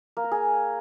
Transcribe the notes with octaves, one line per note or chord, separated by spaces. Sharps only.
A#3
A#4
G#4